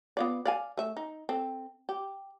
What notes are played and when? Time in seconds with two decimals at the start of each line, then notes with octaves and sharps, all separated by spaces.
0.17 B3 F4 D5
0.45 D5 F5 G#5
0.77 A3 E5
0.97 D#4
1.29 C4 A4
1.89 G4